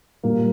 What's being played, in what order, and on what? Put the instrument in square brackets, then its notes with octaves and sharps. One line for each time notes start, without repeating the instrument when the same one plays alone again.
[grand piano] A#2 G3 A#3